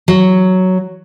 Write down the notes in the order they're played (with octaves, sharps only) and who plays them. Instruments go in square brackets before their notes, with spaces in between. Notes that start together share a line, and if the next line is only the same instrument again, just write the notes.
[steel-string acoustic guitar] F#3